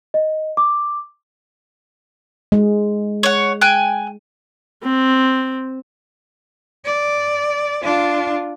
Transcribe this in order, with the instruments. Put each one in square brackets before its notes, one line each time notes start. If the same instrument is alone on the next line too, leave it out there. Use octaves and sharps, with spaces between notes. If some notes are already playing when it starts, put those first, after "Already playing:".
[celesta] D#5
D6
[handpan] G#3
[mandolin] C#5 F#5
G5 G#5 F#6
[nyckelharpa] C4
[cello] D5
D4 F4